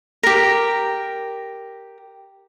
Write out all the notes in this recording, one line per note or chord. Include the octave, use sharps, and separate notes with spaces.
G4 A#4